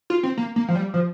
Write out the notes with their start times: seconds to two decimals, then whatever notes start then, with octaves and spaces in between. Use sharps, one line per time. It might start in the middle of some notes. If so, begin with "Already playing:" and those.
0.10 F4
0.23 C4
0.37 A#3
0.56 A#3
0.68 F3
0.75 G3
0.94 F3